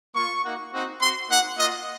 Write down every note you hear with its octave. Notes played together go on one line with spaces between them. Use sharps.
A#3 F4 C#6
A#3 D#4 F#4
C4 D#4 F#4
C4 F#4 C6
A#3 D#4 F#4 F#5
A#3 F4 D#5